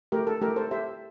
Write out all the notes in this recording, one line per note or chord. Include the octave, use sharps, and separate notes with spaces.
A3 G4 A#4
A4
A3 G4 A#4
A4 C5
G4 C5 E5